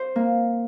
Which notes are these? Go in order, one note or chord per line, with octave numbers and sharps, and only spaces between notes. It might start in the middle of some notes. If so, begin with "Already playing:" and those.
Already playing: C5
A#3